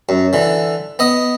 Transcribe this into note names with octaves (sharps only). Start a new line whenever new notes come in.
F#2
D3 E3
B3 D#5